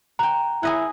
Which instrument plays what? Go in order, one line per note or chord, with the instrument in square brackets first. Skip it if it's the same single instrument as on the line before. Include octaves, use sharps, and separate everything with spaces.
[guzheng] F#5 G5 [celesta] A#5
[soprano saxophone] E4 [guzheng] G#4 D#5 F#5